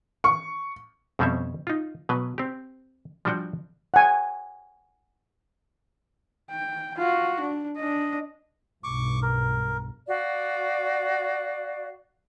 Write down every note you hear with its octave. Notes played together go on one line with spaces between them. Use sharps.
C#6
F2 B2 G3 C4 C#4 E5
D#4 F4
B2 F#3 B4
C4 G4
F3 G3 D4 F#4 G5
F#5 G#5
G5
F4 F#4
D4
D4 D#5
B1 G2 C#6 D6
A#4
F#4 D5 F5